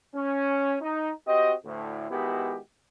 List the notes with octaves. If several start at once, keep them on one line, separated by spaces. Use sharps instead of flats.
C#4
D#4
C4 F#4 G4 D#5
D2 A2
D#3 G#3 B3 E4 F#4 G4